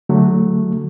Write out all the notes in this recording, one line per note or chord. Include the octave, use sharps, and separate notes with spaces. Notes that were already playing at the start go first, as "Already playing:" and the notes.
D3 F#3 A3